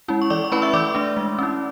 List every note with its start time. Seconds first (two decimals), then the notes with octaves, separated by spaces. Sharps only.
0.08 G#3 C#4 E4
0.22 C#6
0.30 E3 D5 D6
0.44 C#6
0.52 A3 C#4 E4 B4 B5
0.62 E5 E6
0.73 E3 D5 D6
0.95 A3 D4
1.17 G#3
1.39 C#4 E4